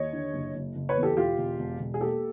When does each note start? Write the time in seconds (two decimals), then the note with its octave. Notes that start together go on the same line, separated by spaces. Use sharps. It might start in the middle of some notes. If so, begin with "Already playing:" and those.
Already playing: D#2 C#5 D#5
0.13 D3
0.33 F#1
0.54 F#1
0.75 F#1
0.89 B4 C#5
0.97 E2
1.03 G4 A4
1.17 E1 F4 G4
1.38 E1
1.59 E1
1.79 E1
1.94 G#4
2.01 A#3 G4 A4